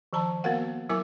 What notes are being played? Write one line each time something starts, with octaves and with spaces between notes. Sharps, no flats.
D#3 F3 A5 A#5
A#3 B3 F#4 A#4 F5 F#5
F#3 E4 A#4 G#5 D6